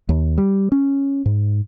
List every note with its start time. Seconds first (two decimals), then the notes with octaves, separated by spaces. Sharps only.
0.09 D#2
0.38 G3
0.72 C#4
1.26 G#2